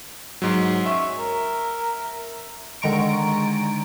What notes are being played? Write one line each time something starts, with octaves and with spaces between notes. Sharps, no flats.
G#2 F#3
C#4 E5
A#4
D3 D#3 G#3 A#5 C#6 D7